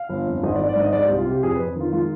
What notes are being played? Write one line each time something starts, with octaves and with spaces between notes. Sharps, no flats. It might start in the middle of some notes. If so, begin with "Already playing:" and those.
Already playing: F5
G1
F2
G#1 D#5
G#1 D5
D5
G#2 D#5
G#3 D5
C2 G4
F4
C3 G4
F2 G#4
F2 B4
D#3 F4
G#3 F4